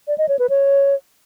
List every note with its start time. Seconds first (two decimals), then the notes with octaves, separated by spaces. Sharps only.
0.07 D5
0.18 D#5
0.28 C#5
0.39 B4
0.49 C#5